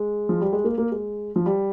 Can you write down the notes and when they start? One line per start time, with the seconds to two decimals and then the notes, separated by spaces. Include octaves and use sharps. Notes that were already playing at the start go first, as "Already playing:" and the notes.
Already playing: G#3
0.29 F3
0.41 G3
0.53 G#3
0.64 A#3
0.78 A#3
0.92 G#3
1.36 F3
1.46 G3